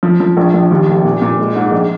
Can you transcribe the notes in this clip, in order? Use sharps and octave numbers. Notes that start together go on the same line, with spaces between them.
F3
F3
A#1
A#1
D#2
F1
A#2
A#2
G#3
G#2
A#1